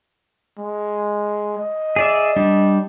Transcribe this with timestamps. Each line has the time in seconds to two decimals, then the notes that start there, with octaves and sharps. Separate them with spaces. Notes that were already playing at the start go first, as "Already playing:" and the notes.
0.58 G#3
1.58 D#5
1.96 G#4 D5 E5
2.36 G3 D4